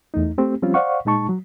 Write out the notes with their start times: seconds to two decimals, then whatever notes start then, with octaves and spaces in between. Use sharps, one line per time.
0.14 E2 A3 D#4
0.38 A3 C4 G4
0.62 F3 G3 C4 C#4 F4
0.74 C5 D5 F5 F#5 C#6
1.05 A#2 G#3 D#4 A5 C#6
1.29 F#3